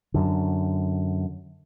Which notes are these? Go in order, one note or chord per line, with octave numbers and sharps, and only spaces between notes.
F#2 D3